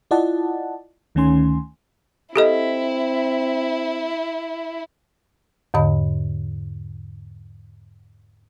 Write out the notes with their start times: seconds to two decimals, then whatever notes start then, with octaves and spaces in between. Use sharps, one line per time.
0.11 E4 F4 D5 D#5 F#5 A5
1.15 D2 D#3 A3 C#4 G#5 C6
2.36 C4 E4 G4 A4 D#5
5.74 E2 G#2 D3 D#5 B5